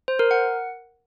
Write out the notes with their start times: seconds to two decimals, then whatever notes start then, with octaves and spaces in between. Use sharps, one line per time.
0.08 C5
0.19 A#4
0.31 F#5